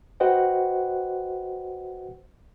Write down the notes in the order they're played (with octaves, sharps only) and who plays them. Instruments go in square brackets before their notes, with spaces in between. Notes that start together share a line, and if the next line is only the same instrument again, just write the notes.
[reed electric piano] F#4 B4 C5 D#5 F#5 G5